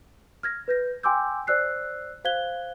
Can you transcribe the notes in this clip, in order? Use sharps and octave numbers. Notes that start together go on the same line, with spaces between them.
F6 G#6 A#6
B4 G6 A#6
G5 G#5 C6 D6 E6 G6
C5 D5 E6 F#6 C7
C5 F5 F#6 G#6 G7